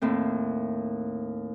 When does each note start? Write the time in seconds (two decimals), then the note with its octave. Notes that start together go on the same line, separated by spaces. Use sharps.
0.02 D#2 A2 C4